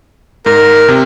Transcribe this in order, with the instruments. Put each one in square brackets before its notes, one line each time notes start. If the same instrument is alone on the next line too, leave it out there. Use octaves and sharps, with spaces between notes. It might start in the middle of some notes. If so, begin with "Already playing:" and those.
[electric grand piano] G#2 [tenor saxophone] A#4
[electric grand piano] C3